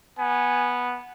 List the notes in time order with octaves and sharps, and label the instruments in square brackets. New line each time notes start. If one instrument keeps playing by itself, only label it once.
[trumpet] B3 [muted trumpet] G#5